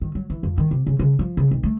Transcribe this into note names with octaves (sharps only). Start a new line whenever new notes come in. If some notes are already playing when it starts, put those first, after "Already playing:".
D#3
F#3
E3
F2
D#3
C3
C#3
C#3
F3
C#3
B1
A3